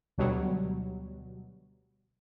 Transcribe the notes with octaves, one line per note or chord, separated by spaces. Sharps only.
D2 B2 F#3 G3